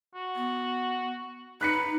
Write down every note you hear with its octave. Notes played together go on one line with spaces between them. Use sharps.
F#4
B3
D#4 B4 F#6 B6 C#7